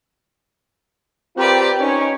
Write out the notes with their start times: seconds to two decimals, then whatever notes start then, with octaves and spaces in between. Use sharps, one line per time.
1.37 C4 F4 G4 A#4 B4 D5
1.81 C#4 D#4 C#5